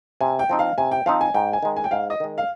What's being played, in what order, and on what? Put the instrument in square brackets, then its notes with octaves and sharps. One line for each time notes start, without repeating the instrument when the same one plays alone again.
[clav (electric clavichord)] C3 [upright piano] G#5
[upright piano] G5
[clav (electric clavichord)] F3 C4 D#4
[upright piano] F5
[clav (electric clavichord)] C3 [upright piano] G#5
[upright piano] G5
[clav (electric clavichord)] F3 C4 D#4 [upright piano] F5
[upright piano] G#5
[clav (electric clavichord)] G#2 [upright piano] G5
[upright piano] G#5
[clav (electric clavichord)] D#3 G#3
[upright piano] G#5
G5
[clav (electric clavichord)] G#2 [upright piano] F5
[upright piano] D#5
[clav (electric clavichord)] D#3 G#3
[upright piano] F5